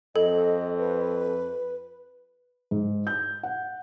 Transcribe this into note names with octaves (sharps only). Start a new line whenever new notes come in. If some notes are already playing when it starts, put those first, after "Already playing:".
F2 A4 D#5
B4
G#2
G6
F#5